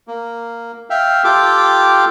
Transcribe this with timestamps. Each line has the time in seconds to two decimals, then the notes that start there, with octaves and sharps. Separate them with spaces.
0.08 A#3
0.90 E5 F5 G5
1.24 F4 G4 A4 G5 D6